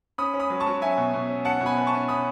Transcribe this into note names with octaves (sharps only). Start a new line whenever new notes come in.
C#4 B5 D#6
C#4
B5 D#6
F#3
A5 C#6
F#3
C#4 E5 G#5
B2
B2
C#4
C#4 F#5 A5
B2
G#5 B5
B2
A5 C#6
C#4
C#4 B5 D#6